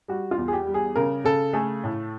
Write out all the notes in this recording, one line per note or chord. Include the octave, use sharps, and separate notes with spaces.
G3 F#4
F4
E2
G#4
G4
G3
G#4
C#3 A#4
C#3 A4
A3 G#4
A2